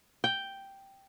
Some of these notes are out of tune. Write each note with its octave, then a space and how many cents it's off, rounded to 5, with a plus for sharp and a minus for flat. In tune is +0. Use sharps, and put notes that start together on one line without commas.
G5 +0